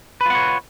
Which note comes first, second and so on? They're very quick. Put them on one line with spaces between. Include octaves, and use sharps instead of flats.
B4 F4 F#5 C#5